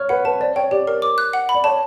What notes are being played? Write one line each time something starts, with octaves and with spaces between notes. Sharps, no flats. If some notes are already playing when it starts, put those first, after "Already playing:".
Already playing: C#5 F6
B4 F#5
B4 A5
C5 D5
C#5 G5
G4 D5
A#4
D6
F#6
F#5
B5
D5
C#5 A5